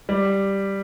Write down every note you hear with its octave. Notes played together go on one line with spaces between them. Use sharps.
G3